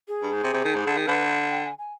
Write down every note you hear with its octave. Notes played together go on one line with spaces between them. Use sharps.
G#4
G2
G#2
C3
C3
D#3
G#2
D3
D#3
D3 B4
G5
G#5
G#5